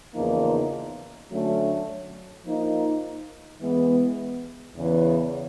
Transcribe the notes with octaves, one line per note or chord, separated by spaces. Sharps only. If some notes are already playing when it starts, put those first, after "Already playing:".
E2 C#3 F3 A#3 D#4
D3 F#3 A3 C#4
F3 A#3 D#4
E3 G#3 B3
E2 C#3 E3